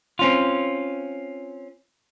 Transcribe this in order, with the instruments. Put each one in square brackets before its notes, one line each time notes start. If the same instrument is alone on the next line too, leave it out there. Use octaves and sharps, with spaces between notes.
[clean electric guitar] C4 C#4 F4